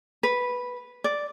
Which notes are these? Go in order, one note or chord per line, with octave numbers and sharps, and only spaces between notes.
B4
D5